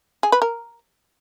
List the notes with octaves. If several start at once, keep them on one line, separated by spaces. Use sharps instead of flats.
G#4
B4
A#4